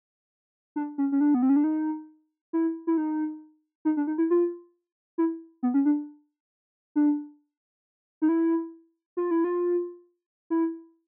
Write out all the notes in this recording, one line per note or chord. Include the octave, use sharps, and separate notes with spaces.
D4
C#4
C#4
D4
B3
C4
C#4
D4
D#4
E4
E4
D#4
D#4
D4
D#4
E4
F4
E4
B3
C#4
D4
D4
D#4
E4
F4
E4
F4
E4